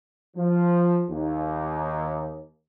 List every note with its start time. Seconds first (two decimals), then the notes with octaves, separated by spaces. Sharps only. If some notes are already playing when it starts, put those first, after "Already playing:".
0.37 F3
1.10 D#2